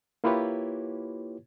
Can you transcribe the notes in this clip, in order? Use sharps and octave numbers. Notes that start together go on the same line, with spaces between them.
A#3 E4 F4 G4 B4 C#5